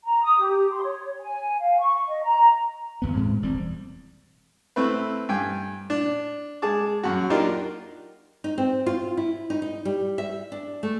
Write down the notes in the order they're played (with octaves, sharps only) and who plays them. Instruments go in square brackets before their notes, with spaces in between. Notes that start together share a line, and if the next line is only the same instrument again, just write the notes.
[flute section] A#5
D#6
G4
C6
C#5
G#5
F5
C#6
D#5
A#5
[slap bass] G1 E2 B3
A2 G#3 C4
E1 E2 G3 C4
[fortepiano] A3 C4 E4 B4
G2 G5 G#5
D4
G#3 G#4 A5 D6
F#2 F#4
A#3 D4 D#4 F4 G4 A#4
[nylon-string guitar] D#4
C4
F4
E4
D#4
D#4
G3
E5
D4
A3